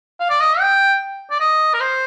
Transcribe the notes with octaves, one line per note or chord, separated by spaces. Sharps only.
F5
D5
D#5
G5
D5
D#5
A#4
C5